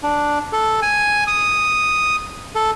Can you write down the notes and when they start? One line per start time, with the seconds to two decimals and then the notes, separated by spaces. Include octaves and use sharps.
0.03 D4
0.53 A4
0.82 G#5
1.27 D#6
2.55 A4